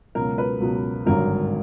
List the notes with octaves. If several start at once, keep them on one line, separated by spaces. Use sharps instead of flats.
C#2 B2 F#3 A#4
B4
C#2 B2 F#3
G#1 G2 D3 F#3 A#4